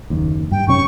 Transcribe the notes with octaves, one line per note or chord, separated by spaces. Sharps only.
F#1 D#2
G2 G5
F#2 C3 C#4 C#6